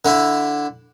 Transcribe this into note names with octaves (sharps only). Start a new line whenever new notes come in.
D3 E4